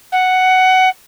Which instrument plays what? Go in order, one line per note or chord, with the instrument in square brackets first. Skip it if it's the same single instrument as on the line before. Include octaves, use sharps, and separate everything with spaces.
[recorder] F#5